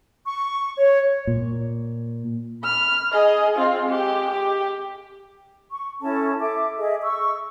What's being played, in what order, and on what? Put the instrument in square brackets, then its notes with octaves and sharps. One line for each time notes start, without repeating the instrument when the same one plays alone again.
[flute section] C#6
C#5
[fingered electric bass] A#2
[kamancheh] B5 F6
G#4 D#5
C4 F4
G#3 G4
G4
[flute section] C#6
C#4 E4 A4 A5
A4 E5 D6
G#4 D#5 E5
C#6 E6